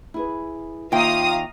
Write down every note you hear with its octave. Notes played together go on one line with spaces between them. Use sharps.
E4 G#4 B4
D#2 F4 E5 F5 G5 A#5 D#6